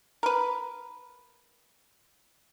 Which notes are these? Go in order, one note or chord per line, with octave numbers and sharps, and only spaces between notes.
A#4 B4